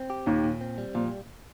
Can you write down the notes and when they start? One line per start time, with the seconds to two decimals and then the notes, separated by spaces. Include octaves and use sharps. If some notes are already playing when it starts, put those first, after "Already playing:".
Already playing: C4
0.10 G4
0.26 D#2 A#2 D#3
0.44 A#2
0.61 C4
0.78 G3
0.94 A#2 F3